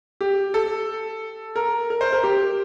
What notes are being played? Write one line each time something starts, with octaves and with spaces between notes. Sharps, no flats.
G4
A4
A#4
A#4
C5
A#4
G4